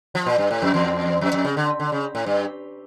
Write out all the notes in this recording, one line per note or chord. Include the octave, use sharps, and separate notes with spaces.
F3
A#2
G2
A2
F2
E2
F2
F2
C#3
D3
D3
C#3
A2
G2